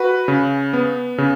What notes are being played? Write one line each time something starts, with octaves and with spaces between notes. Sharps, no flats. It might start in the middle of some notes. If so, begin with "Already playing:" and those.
Already playing: F#4 B4
C#3
B3
C#3